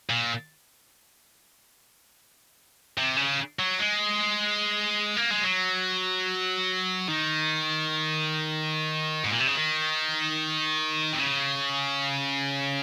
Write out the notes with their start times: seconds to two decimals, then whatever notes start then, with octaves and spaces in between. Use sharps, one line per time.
0.10 A#2
2.98 C3
3.17 C#3
3.59 F#3
3.79 G#3
5.17 A#3
5.31 G#3
5.44 F#3
7.09 D#3
9.24 G#2
9.31 A#2
9.40 C3
9.47 C#3
9.55 D#3
11.13 C3
11.20 C#3